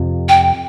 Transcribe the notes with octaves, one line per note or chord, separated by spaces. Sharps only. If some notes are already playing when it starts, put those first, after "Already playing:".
Already playing: F2 C3 F3
G5